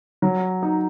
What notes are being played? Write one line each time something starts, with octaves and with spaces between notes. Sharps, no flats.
F#3
D#4